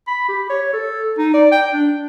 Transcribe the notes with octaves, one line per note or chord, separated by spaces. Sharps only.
B5
G4
C#5
A4
D#4
D5
G5
D4